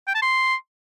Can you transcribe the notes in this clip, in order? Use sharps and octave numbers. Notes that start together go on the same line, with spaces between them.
G5
A5
C6